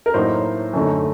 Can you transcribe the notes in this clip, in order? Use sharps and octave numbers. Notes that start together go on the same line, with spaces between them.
A#4
A2 F#3 A#3 D#4 C5
F#2 D3 A3 D#4